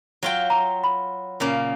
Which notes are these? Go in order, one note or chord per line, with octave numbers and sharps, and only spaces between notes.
F#3 F4 G5
A#5
B5
A#2 C#3 A#3